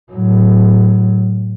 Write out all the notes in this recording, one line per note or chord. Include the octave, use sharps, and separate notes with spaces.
A2 F#3